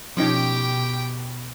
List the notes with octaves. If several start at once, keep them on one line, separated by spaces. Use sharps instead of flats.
B2 F3 C#4 D#4 G4 G5